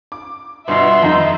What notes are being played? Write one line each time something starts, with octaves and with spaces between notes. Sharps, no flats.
D6
G1 B2 E5 C6
F2 D#3 D#4